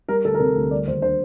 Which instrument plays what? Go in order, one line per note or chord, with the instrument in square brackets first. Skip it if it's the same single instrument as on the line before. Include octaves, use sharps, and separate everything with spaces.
[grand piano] G3 A#4
D2 A4
A#4
C3 A4
D2
G3 D5
D#2 C5
D3 C5